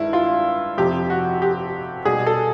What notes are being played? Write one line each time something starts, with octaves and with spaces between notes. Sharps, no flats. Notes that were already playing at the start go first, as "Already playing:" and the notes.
Already playing: G2 D#3 G#3 E4
F4
F2 C3 F3 G4
F#4
G4
B2 G3 G#4
A4